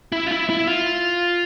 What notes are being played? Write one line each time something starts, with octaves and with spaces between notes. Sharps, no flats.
E4
F4
E4
E4
F4